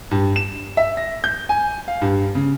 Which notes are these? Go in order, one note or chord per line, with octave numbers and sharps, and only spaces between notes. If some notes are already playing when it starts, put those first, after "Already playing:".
G2
E7
E5
A#6
G6
G#5
F5
G2
C#3